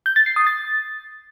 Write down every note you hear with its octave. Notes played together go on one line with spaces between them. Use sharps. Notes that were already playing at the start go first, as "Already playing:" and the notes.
G6
A6
C7
D#6
A6